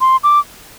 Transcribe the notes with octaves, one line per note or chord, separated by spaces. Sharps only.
C6
D6